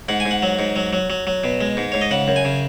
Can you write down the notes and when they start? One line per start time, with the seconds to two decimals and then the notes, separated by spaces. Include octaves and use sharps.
0.09 G#2 F#5
0.20 G#5
0.25 G#2
0.31 F#5
0.43 F#3
0.59 G#2
0.76 F#3
0.93 F#3
1.10 F#3
1.27 F#3
1.44 B2
1.61 G#3
1.77 G#2
1.92 G#2 C#5
2.01 D#5
2.11 C#3 F#5
2.28 F#2
2.36 G#5
2.45 C#3